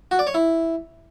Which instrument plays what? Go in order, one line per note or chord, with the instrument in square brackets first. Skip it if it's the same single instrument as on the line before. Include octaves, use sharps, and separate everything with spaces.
[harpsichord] F#4
D5
C#5
E4